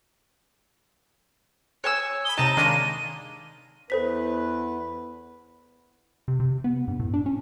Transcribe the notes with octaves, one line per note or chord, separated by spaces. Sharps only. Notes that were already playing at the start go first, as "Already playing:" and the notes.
C#5 G#5 E6
B5 D#6 G7
C3 D#4 A5 A#5 D#7
D#3 G#3 A#3 D4
E2 A4 B4 C5 B6
C3
C3
B3
G2
A2
D4
C#4